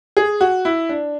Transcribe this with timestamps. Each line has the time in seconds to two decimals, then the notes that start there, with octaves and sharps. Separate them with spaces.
0.17 G#4
0.41 F#4
0.65 E4
0.89 D4